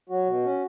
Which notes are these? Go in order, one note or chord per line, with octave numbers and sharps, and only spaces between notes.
F#3 F#4
B2
C#4